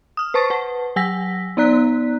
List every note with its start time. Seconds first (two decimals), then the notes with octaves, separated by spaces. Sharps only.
0.17 D#6 F6
0.34 B4 C5 A5 C#6 A6
0.50 B4 F#5 A5
0.96 F#3 F#5 G#5 E6 A#6 B6
1.57 B3 D#4 D5 A#5 F#6 B6